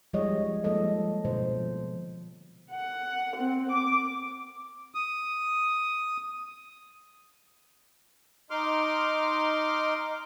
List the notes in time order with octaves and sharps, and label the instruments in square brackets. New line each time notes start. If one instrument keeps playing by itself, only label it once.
[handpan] F3 G3 G#3 G#4 C#5 D#5
F3 G#3 A#3 A4 D#5
B2 D3 F3 C5
[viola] F#5
C4
D6
[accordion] D#6
D#4 C6 D6 F6